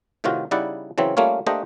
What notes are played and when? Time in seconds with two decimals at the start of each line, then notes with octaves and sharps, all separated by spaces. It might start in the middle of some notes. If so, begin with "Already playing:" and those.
0.24 A2 C3 D#3 F4 F#4
0.51 C#3 G3 D#4 E4 D5 F#5
0.98 C#3 E3 F#3 C4 C#4
1.17 G3 A3 A#3 C#4 F4 C#5
1.47 A3 A#3 D4 G4 C5 D#5